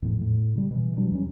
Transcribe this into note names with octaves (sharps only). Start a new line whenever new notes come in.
E2 A2 F3
A2
C#3 G3
B2 E3
E3 F#3 G3 D4
E2 G3 C#4